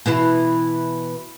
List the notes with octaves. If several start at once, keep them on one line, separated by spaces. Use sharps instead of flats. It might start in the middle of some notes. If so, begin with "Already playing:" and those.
B2 E3 E4